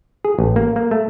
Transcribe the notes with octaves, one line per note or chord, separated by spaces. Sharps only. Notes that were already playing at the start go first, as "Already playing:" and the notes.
G#4
A1
A#3
A#3
A3